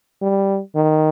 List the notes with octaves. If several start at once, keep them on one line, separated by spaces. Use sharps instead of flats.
G3
D#3